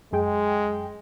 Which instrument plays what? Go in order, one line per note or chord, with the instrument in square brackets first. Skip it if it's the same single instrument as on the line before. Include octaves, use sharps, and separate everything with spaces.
[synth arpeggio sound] F#2 G#4 G5 [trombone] G#3